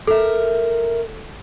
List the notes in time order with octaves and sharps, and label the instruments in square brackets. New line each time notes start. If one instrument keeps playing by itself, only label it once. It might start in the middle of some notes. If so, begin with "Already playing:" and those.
[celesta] A4 [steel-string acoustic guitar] A#4 E5